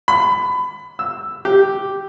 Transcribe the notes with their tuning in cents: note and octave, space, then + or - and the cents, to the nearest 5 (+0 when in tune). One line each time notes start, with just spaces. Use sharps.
B5 +25
E6 +5
G4 -5